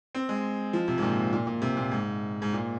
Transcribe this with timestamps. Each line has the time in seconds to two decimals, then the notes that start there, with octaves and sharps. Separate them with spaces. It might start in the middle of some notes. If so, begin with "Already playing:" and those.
0.15 C4
0.29 G#3
0.73 F3
0.88 C3
0.98 G#2
1.02 A#2
1.33 A#2
1.47 A#2
1.62 C3
1.77 A#2
1.91 G#2
2.42 G#2
2.53 A#2